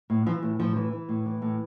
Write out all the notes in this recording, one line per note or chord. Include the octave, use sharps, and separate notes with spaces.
A2
E3 F3
A2
A2 F3
E3
E3
A2
E3
A2